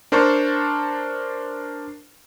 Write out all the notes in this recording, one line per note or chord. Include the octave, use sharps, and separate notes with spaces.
D4 A#4 C5 A5 C#6